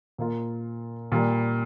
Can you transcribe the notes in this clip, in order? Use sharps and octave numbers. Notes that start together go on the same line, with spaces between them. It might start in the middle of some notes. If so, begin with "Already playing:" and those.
A#2 A#3 F4
A#2 G3 A#3